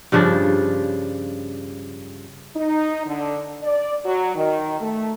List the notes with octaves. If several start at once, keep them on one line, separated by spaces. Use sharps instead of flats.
G2 C#3 F3 D4
D#4
D3
D5
F#3
D#3
A3